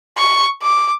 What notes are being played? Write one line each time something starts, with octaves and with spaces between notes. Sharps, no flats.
C#6
D6